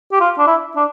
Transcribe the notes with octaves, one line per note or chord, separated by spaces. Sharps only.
G4
F4
D4
E4
D4